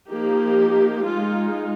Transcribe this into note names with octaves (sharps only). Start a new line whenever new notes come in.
F3 A#3 D#4 G4
G#3 D#4 F4